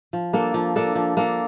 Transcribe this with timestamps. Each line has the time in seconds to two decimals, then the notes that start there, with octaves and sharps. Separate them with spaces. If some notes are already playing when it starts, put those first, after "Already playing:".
0.13 F3
0.33 A#3 D4 A4
0.54 F3
0.76 A#3 D4 A4
0.95 F3
1.17 A#3 D4 A4